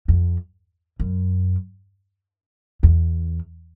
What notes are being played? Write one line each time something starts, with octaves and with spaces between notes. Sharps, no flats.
F2
F#2
E2